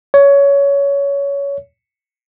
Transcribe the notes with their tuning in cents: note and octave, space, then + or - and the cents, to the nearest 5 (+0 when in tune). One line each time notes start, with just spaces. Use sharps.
C#5 +20